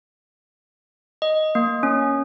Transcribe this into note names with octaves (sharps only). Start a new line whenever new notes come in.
D#5
A#3
C#4